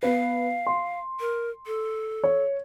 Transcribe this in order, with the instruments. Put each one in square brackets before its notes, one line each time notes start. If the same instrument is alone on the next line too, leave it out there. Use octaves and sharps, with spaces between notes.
[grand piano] B3 B4 [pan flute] F5
[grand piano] C6
[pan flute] A#4
A4
[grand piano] C#5